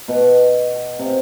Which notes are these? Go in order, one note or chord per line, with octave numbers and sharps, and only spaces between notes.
B2
C3